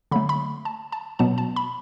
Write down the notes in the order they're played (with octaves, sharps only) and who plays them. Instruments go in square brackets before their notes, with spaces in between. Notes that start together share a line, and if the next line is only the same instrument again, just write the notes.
[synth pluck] D3 F#3 A3 B5
B5
A5
A5
B2 F#3 B3 A5
A5
B5